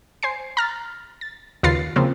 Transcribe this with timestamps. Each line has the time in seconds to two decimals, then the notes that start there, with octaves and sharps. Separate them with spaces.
0.23 C5 G#5 C7
0.57 A#5 F6 A6
1.21 A6
1.63 D#2 C#3 F4 B4 A6 C7
1.96 C#3 F3 A#3 C4